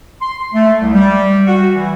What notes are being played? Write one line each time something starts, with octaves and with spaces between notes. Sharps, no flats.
C6
A3
C2
G3
F#4
E3